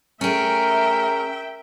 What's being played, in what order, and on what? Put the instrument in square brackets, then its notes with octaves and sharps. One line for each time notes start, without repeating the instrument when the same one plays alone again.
[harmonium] A3 [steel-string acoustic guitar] C#4 G#4 [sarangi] A#4 [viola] E5 G5